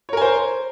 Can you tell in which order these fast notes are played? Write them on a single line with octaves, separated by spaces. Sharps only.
C#5 A#4 G#5 C5